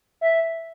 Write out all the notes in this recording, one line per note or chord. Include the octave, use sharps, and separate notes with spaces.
E5